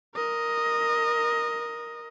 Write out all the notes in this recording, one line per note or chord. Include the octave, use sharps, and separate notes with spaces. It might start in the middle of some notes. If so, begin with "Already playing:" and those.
A#4 D#5